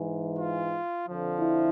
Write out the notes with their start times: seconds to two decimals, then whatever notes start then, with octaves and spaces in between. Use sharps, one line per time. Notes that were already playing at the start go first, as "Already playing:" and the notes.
Already playing: G#2 E3
0.39 F4
1.07 F2 D3 F3
1.40 E4